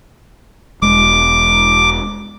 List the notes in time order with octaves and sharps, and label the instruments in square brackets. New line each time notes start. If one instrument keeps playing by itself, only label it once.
[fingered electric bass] E1 G#3 [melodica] D6